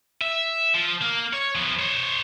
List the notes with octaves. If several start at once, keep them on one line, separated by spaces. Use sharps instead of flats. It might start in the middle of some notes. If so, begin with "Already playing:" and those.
E5
F3
A#3
C#5
F3 B3
C5 C#5